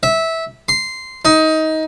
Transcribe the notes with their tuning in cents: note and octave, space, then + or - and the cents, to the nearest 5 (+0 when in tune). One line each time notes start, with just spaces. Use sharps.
E5 -15
C6 -10
D#4 +20